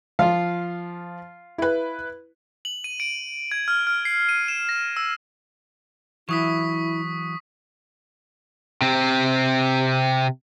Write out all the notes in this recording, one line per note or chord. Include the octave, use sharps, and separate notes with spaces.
F3 F4 F5
E4 B4
F#7
D#7
D7
G#6
F6
F6
C7
D#7
E7
A#6
E6
E3 F#3 E4 C#6 D#6 B6
C3 C4